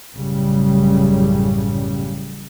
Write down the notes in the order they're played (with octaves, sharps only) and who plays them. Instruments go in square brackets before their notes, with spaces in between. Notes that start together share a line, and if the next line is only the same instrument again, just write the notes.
[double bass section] A1 F#2 C#3 G3